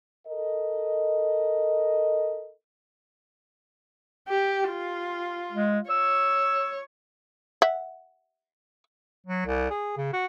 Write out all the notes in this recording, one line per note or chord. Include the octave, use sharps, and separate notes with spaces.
A4 A#4 D#5
G4
F4
G#3
C#5 E6
E5 F#5
F#3
C2
G#4
C#3
F#4